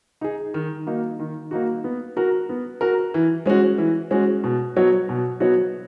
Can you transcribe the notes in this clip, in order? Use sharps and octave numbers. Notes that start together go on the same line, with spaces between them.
D#4 G#4
D#3
A#3 D#4 F#4
D#3
A#3 D#4 F#4
B3
F#4 A#4
B3
F#4 A#4
E3
G#3 C#4 F#4
E3
G#3 C#4 F#4
B2
F#3 B3 F#4 C#5
B2
F#3 B3 F#4 C#5